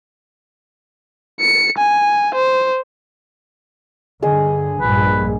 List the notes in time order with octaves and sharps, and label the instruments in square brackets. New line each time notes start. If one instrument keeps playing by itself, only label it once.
[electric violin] C#7
G#5
C5
[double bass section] G2 D3 [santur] G#4 D#5
[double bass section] A#1 G2 G3 [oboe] B4